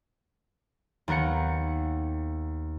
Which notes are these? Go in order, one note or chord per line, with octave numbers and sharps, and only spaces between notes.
D#2 B3 A#4 F#5 C#7